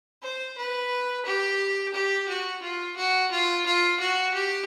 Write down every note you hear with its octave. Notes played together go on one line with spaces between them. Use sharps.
C5
B4
G4
G4
F#4
F4
F#4
F4
F4
F#4
G4